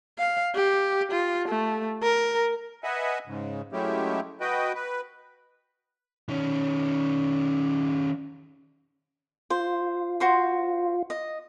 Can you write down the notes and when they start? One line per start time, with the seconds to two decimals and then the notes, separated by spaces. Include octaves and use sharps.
0.19 F5
0.55 G4
1.11 F4
1.48 A3
2.03 A#4
2.84 B4 D#5 E5 F#5 G#5
3.27 G#2 C#3
3.73 F#3 G#3 A3 C#4 E4 G4
4.41 F#4 B4 D#5 G5
4.75 B4
6.29 D#3 C#4
9.50 F4 C5
10.20 F#4 C5 C6
11.10 D#5